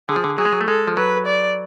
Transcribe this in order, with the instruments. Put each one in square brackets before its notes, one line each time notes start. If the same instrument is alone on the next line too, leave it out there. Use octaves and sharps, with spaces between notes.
[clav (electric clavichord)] D3 [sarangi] G#4
[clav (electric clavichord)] F3
D3
[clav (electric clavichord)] F#3 [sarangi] G#4
[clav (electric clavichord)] G#3
F#3
A3
[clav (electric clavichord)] G#3 [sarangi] A4
[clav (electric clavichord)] F3
[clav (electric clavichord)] F#3 [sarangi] B4
[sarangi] D5